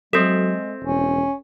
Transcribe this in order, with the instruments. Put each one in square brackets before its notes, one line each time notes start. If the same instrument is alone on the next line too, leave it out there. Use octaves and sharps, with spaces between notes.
[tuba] F#3 [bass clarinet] G#3 [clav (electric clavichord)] C4 E5 [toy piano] A4 D#6
[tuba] E1 [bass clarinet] C#4